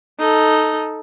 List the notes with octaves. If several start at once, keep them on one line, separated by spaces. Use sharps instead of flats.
D#4 A4